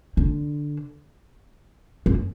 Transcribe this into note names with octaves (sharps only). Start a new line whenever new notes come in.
D3
F#2